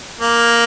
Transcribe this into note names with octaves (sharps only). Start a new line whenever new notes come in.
A#3